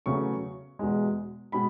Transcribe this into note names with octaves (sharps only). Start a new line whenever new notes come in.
E2 C#3 F#3 A3 C#6
E2 B2 G#3
B2 G#3 B5